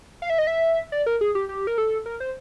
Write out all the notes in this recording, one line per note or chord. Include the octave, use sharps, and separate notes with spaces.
F5
E5
D#5
E5
D5
A#4
G#4
G4
G4
A#4
A4
A#4
C5